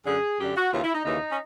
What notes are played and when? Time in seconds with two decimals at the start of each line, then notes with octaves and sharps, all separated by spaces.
0.06 F#2 D3 G#4
0.39 F#2 D3 G4
0.56 F#4
0.72 D#2 C#3 E3 F4
0.83 E4
0.95 D#4
1.05 D#2 C#3 E3 D#4
1.31 C#4